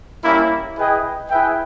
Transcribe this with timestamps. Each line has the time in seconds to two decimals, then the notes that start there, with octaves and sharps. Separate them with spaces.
0.24 G3 A#3 C#4 E4
0.77 E4 G#4 B4 D#5 G5
1.30 E4 G#4 B4 E5 G5